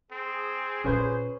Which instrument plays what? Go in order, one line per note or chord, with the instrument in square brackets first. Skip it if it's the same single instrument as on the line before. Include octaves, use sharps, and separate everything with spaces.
[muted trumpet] C4 [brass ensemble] G#4
[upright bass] A#2 F4 [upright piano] C#4 B4 G6 [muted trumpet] C5